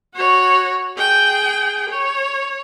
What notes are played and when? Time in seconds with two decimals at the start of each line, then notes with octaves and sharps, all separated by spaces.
0.15 F#4 C#5
0.97 G#4 G5
1.89 C#5